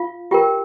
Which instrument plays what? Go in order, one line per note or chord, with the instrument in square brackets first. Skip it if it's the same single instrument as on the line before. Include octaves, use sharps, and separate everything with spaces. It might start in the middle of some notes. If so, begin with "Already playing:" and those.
Already playing: [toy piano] F4 F5
F4 G4 A#4 G5